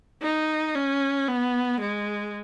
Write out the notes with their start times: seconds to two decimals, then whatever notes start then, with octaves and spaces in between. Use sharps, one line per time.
0.22 D#4
0.75 C#4
1.28 B3
1.80 G#3